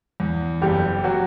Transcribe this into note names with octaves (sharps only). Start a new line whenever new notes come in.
E2
F#1 G3 G4
F#3 F#4